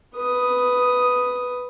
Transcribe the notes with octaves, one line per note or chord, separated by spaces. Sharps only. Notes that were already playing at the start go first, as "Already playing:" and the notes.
B4 D#6